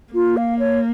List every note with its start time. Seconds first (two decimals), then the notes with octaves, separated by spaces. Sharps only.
0.14 A#3 F4
0.37 F5
0.59 C#5